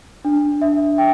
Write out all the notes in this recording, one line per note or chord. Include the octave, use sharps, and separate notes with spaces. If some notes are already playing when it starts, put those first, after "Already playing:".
D4
E5
G5